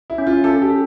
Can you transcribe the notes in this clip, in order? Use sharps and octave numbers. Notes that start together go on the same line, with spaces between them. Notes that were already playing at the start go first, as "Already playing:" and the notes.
E4
C#4
F4
C#4 A4
G4
A4